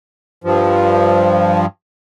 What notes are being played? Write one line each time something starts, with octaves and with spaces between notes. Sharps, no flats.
G2 F3